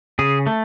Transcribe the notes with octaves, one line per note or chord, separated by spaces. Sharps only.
C#3 G#4
A3